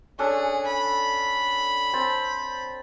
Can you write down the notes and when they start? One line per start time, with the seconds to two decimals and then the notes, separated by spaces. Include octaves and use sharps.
0.19 C#4 D4 G#4 A4
0.67 B5
1.93 C4 A5